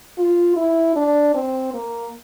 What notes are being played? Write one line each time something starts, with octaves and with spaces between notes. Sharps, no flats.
F4
E4
D4
C4
A#3